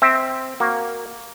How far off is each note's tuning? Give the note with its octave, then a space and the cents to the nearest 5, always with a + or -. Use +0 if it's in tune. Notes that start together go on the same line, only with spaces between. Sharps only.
C4 +0 E5 -15
A#3 +0 F#4 +0